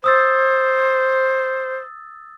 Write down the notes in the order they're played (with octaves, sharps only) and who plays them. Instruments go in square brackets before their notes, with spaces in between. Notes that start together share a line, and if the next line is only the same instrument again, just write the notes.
[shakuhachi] C5 [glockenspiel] D#6 E6 A6